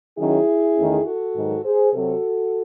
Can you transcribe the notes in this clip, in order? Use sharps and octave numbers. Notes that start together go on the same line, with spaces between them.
D#3 F#3 C#4 E4 G#4
E2 D#3 A3 C#4
F#4 A4
G#2 D#3 F#3
G#4 C5
C3 F#3 C4 F#4 A4